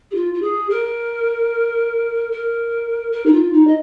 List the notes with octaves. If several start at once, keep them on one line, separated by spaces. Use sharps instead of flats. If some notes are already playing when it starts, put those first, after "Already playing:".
G#4
F4
F4
G#4
A#4
A#4
A#4
D#4
F4
D#4
D#5